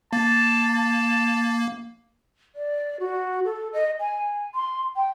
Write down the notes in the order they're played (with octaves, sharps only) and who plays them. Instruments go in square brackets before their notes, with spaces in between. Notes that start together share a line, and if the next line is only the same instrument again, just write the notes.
[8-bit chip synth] A#3 [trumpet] A5
[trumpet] A5
[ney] D5
F#4
A4
D#5
G#5
C6
G5